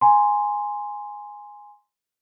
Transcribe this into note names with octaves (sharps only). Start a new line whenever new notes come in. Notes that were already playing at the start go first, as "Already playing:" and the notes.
G#5 A#5 C6